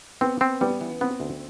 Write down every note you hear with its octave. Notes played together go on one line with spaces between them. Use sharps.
B3 C4
C4
G3 B3
E3
B3 C4
D2